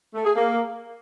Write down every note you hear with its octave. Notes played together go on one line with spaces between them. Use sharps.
A3
G#4
A#3